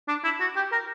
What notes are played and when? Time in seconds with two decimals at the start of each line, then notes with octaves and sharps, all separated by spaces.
0.08 D4
0.24 E4
0.40 F#4
0.56 G4
0.72 A#4